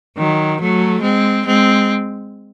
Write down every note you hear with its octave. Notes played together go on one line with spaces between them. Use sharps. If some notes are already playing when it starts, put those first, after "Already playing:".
D#3 F#3
F#3 A3
G#3 C4
G#3 C4